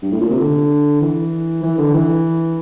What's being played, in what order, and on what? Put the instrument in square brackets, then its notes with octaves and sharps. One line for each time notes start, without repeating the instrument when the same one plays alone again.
[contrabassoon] G2
A2
A#2
C3
D3
E3
E3
D3
E3